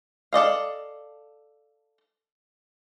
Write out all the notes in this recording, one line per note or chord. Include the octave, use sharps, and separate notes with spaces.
A4 D5 D#5 F5